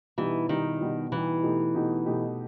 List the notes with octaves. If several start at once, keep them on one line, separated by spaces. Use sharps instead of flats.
B2 E3 G3 D#4 G4
B2 D#3 G3 D#4 G4
B2 G3 D#4 G4
B2 E3 G3 D#4 G4
B2 A3 D#4 G4
B2 A3 D#4 G4
B2 A3 D#4 G4